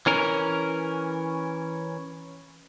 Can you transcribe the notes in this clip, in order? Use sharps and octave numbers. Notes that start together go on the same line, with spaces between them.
E3 C#4 A#4